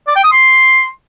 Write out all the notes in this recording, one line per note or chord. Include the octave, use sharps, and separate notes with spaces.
D5
G5
D#6
C6